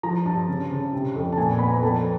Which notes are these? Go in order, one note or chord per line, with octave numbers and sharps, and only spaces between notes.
F3 A#5
G2 A5
C#3
C#3
C3
F2
A5
A#2 G#5
B3 B5
A#5
F2 A5